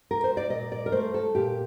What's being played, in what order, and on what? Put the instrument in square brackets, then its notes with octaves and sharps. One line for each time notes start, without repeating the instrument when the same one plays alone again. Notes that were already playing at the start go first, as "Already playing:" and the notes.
[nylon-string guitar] A#4
C5
D5
A#2 D#5
D5
A#4
A3 C5
A4
A#2 G4